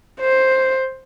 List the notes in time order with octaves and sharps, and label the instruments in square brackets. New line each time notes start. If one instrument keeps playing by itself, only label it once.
[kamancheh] C5